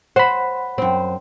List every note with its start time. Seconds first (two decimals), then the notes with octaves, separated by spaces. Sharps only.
0.16 C5 F#5 B5
0.78 F#2 C4